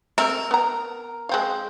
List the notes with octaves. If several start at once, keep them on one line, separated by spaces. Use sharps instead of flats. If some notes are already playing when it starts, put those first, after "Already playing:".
A3 C4 A#4 E5
B3 A#5
G#3 C4 F5